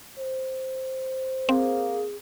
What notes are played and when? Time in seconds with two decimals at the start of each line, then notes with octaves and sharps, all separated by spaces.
0.19 C5
1.49 A#3 C4 G#4